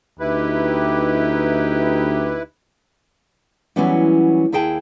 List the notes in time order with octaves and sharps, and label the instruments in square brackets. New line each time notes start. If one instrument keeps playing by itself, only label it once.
[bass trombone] D2 [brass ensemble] D#4 G4 [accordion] E4 B4
[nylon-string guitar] E3 F#3 G3 B3 C#4 E4
D#2 E4 G#4 G5 A5